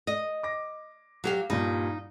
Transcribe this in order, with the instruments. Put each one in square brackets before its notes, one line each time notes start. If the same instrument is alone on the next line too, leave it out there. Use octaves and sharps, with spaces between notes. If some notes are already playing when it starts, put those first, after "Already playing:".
[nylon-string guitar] D#5
[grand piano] D6 A#6
[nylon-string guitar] F#3 G4 F5
[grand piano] G2 A#2 [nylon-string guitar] D#4